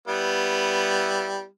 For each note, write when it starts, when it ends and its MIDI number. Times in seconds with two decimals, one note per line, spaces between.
0.08 1.45 55
0.08 1.45 59
0.08 1.45 64